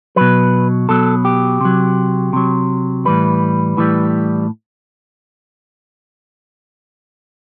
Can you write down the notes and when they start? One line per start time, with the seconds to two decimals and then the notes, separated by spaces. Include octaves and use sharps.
0.16 B2 F#3 B4
0.89 B2 F#3 A4
1.25 G4
1.61 C3 F#3
2.33 C3 F#3
3.05 A2 E3 G3 B4
3.77 A2 E3 G3